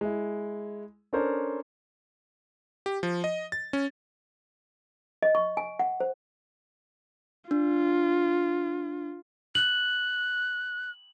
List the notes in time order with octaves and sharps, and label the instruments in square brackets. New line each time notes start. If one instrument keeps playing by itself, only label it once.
[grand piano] G#3 E4
C#4 D4 A4 A#4 C5 C#5
[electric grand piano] G4
F3
D#5
A6
C#4
[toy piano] D#5
C#6
G#5
F#5
C5
[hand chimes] D4 [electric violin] F4
[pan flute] F#6 [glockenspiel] F#7